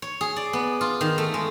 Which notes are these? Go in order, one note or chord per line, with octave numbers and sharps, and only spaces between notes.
C#5
G#4
D5
B3
F4
D#3
A3
G#3